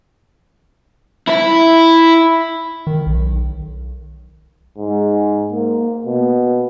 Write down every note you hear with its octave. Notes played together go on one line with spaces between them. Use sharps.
E4 E5
D#3
B1
G#2
A#3
B2